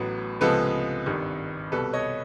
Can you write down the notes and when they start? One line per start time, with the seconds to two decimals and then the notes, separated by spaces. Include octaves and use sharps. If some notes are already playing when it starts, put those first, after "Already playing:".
Already playing: A1 A2 F#3 B3
0.41 C#2 C3 F3 G#3 B3 A4 B4
1.06 G#1 G2 D#3
1.72 C2 B2 G3 A4 B4
1.93 C#5 D#5